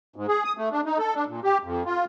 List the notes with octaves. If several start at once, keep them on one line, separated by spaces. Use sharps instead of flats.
G#2
G#4
D#6
A3
D4
D#4
A4
D4
A#2
G4
F2
F4